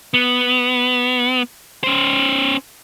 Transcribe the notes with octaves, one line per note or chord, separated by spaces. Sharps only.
B3
C#4 C5